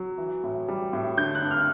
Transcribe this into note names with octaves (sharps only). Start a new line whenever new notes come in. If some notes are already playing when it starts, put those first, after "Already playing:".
Already playing: F#3
E3
A2
G3
A2
D3 G6
F#6
G2
F6